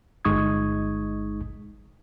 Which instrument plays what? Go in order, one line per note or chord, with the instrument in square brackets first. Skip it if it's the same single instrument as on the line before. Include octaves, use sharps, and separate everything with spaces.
[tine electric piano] G1 G#3 D#4 C#6 D#6 G#6